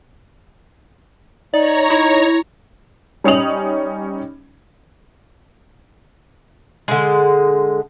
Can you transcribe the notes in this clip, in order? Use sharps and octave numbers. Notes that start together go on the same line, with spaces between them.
D#4 C#5 D5 A#5
D#4 E4
G3 C#4 D#4 D#6 F7 F#7
D3 G#3